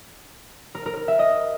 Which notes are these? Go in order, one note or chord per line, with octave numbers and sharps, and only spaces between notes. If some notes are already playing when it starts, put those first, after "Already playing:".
A#4
A#4
A#4
E5
D#5